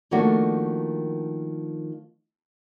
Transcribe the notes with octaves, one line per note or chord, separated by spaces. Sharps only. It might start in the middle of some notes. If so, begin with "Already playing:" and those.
D#3 F3 A3 A#3 D4 F#4